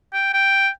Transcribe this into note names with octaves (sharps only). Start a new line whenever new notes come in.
G5
G5